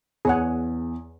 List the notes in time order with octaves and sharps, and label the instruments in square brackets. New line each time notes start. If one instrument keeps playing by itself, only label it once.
[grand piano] E2 [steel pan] G#4 C#5 F#5